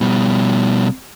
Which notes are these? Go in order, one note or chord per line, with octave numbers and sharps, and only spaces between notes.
B2 G3